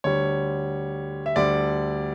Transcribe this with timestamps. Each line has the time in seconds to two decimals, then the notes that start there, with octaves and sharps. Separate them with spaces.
0.04 D2 D3 G3 C#5
1.26 E5
1.36 D2 D3 G3 D5